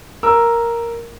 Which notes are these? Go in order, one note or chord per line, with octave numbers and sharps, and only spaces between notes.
A#4 E6